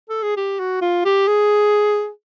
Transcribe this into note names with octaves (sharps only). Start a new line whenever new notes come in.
A4
G#4
G4
F#4
F4
G4
G#4